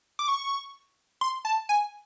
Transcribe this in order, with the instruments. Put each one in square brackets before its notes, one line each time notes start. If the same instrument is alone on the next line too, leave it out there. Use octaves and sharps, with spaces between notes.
[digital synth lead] D6
C#6
C6
A5
G#5